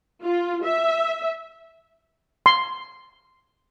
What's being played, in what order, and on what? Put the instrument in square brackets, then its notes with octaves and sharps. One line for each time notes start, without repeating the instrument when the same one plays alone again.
[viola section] F4
E5
[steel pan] C6